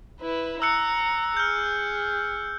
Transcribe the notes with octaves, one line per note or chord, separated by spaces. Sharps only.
E4 B4
A#5 E6 F#6 C#7
G#4 F6 G6